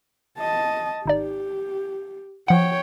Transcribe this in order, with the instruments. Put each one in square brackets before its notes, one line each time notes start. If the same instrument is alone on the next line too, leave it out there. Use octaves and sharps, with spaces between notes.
[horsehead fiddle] D#5 A5
[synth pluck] G#1 D#4 D5 [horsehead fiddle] G4
[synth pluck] F3 F#5 [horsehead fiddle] C#5 G5